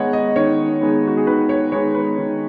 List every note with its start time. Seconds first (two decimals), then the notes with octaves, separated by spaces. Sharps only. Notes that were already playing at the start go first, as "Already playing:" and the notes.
Already playing: D#3 G#3 B3 D#4 C#5 D#5 F#5
0.13 D#5
0.36 D#3 C#5
0.81 G#3 B3 D#4
1.08 F#4
1.17 G#4
1.27 D#3 B4
1.49 C#5
1.72 G#3 B3 D#4 C#5
1.95 B4
2.18 D#3